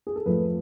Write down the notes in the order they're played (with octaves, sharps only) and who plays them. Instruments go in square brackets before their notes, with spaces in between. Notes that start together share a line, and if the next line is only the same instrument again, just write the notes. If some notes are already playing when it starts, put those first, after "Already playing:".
[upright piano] G#4
A4
F2 F3 A3 B4